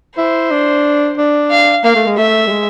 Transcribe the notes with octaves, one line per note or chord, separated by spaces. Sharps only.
E4 C5
D4
D4
F5
A#3 F5
A3
G#3
A3 E5
G3
G#3